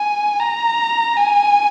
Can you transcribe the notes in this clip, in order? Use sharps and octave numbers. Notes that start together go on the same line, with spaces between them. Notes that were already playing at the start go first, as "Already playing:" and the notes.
Already playing: G#5
A#5
G#5